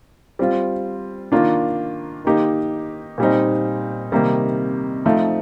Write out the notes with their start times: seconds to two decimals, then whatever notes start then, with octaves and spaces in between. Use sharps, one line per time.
0.39 G3 C4 F4
1.32 D#3 A#3 D4 F4
2.25 D#3 A#3 D#4 G4
3.18 A#2 G3 C4 D#4
4.12 C3 D#3 G3 A#3 D#4
5.05 F3 A3 D#4